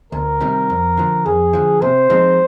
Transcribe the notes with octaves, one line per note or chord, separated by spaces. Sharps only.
D2 A#4
C3 D#3 G3
F2
D3 F3
F2 G#4
D3 F3
C3 C5
F3 G#3 C4 D#4